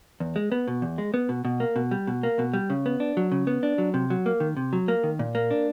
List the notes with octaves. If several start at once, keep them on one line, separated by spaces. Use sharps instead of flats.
E2
G#3
B3
B2
E2
G#3
B3
B2
B2
A#3
B2
G3
B2
A#3
B2
G3
C#3
B3
D4
F#3
C#3
B3
D4
F#3
C3
F#3
A#3
D#3
C3
F#3
A#3
D#3
A#2
A#3
D4